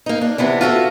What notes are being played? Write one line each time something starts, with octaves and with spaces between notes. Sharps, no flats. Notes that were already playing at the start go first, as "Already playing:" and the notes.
A#3 D#4
D4
C3 E3 B3 D4
F4 F#4 A4 E5